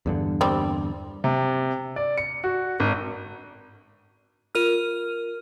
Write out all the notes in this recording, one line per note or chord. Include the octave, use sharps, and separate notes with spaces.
E2 G2 D3
G3 C4
C3
D5
C#7
F#4
G#1
F4 A#4 F6 D#7